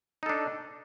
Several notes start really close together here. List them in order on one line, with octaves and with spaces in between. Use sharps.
D#4 A4 D4